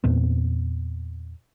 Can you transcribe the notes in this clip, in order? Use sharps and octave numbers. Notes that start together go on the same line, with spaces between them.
E2 A#2 B3 C4